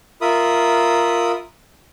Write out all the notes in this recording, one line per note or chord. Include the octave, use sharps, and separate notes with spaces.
F4 A#4 E5 B5 D#6